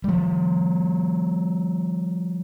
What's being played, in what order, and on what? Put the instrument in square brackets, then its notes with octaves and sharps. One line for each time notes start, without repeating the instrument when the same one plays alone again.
[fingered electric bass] F3 G3